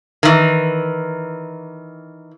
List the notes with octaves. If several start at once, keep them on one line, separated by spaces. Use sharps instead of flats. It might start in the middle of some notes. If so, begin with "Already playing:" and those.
D#3 E3